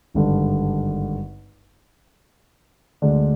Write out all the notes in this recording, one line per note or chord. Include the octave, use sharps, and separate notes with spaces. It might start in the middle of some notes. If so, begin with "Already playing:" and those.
G#1 G2 D3
D2 D3 G#3 D4